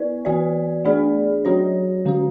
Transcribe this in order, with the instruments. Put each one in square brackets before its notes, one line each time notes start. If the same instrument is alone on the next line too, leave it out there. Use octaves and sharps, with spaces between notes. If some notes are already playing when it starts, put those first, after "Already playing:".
Already playing: [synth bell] B3 E4 B4 D5
E3 B3 F#4 B4 D5
A3 D4 G#4 D5
F#3 C#4 F#4 C#5
D3 G#3 C#4 F#4